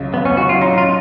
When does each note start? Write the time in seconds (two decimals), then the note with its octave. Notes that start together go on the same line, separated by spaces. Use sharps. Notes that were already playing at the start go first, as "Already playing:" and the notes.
Already playing: C#2 F#3
0.13 C#2 B3
0.25 C#4
0.37 F#3 F#4
0.49 F4
0.61 C#4 D#4
0.78 F4